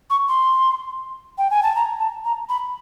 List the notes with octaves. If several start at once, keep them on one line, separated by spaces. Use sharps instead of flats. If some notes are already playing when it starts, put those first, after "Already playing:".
C#6
C6
G5
G#5
A5
A#5
A5
A#5
B5